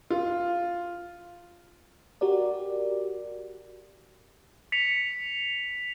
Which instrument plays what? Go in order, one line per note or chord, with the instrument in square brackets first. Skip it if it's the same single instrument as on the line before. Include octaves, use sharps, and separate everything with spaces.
[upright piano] F4
[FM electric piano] F#4 G4 A#4 D5
[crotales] B6 C#7 F7